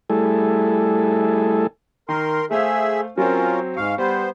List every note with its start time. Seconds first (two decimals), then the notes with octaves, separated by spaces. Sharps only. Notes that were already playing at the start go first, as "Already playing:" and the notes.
0.10 G3 A3 E4 G#4 A4
2.09 D#3 A#4 C6
2.51 A3 G#4 C5 E5 F5
3.18 F#3 C4 C#4 F4 A#4
3.77 G#2 F5 C#6
3.98 G3 B3 C5